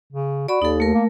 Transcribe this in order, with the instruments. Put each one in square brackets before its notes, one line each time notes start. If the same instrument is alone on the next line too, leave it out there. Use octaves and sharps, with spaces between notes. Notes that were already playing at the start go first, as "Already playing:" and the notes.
[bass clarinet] C#3
[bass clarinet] F#4 [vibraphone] D5 B5
[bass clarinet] D#2 [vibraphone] D#4 A4
[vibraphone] A3 A#4
[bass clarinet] A#3